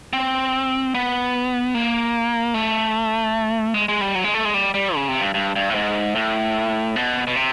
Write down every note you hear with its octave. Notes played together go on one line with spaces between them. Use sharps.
C4
B3
A#3
A3
G#3
G#3
G3
F#3
G#3
A3
G#3
G3
G3
C#3
C3
G2
G2
G2
A2
G#2
A2
B2
B2
C3